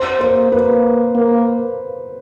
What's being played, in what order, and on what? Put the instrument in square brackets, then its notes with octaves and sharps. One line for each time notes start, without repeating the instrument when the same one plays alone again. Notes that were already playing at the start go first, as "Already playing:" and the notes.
Already playing: [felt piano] C5
[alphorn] A#3 [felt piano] C5
[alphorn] A#3 [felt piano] B4
[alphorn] A#3